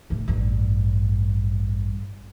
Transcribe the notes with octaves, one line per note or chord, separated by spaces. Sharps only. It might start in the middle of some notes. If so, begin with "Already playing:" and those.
D#2 A2
A1 G2